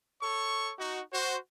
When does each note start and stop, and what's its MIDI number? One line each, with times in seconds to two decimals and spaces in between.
0.22 0.72 69
0.22 0.72 73
0.22 0.72 85
0.79 1.00 63
0.79 1.00 66
1.13 1.36 66
1.13 1.36 72